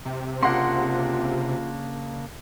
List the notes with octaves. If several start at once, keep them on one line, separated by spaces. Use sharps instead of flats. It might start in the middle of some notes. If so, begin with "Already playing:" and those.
C3
C#3 A#3 D4 F4 F#5 C6